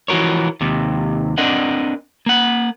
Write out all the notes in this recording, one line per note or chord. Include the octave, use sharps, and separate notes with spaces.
E3 F3 F#4 A#4 C#5
D#2 C3
C4 D4 A#4 D#5 F#5
A#3 F#5